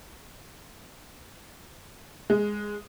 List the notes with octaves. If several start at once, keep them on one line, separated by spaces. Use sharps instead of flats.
G#3